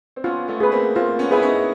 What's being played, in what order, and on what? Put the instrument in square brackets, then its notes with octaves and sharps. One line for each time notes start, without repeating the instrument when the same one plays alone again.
[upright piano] C4
[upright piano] B3 C#4 [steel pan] F4
[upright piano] A3 B3
[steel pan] G#4 B4
[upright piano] A#3 C4
[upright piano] A#3 C4 [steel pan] F4
[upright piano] B3 C#4
[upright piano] E4 [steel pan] G#4 B4
[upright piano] C#4 D#4